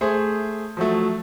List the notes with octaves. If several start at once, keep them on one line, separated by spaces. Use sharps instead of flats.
A3 G#4 C5
F3 F#3 A3